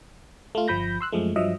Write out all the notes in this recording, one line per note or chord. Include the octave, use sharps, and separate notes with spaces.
A3 F4
G1 F3 B5 G6 A#6
C6 E6 F#6
F#2 F3 G#3 A3
G2 F3 F#3 D#5 E5